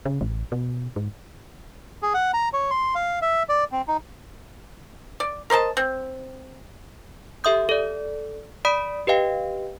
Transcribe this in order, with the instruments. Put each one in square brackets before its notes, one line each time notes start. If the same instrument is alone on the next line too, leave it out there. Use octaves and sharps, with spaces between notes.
[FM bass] C#3
A1
B2
G#2
[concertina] G#4
F#5
A#5
C#5
C6
F5
E5
D5
C4
D#4
[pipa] D5
A#4 C5 D#5 A5
C4
[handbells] G4 A4 E5 C6 D#6 G6
A4 D5
D5 B5 D#6 B6 D7
G4 B4 D#5 F5 G5